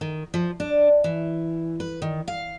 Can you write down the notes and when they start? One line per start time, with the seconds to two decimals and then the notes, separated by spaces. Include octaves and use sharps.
0.01 D#3
0.34 F3
0.60 D4
1.04 E3
1.80 B4
2.02 D#3
2.28 F5